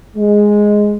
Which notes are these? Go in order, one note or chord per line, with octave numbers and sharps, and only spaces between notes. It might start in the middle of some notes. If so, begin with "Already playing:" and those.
G#3